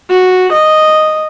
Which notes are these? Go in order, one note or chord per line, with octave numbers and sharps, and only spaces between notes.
F#4
D#5